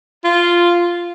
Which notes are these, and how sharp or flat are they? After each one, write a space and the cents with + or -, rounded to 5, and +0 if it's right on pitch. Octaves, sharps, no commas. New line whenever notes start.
F4 -5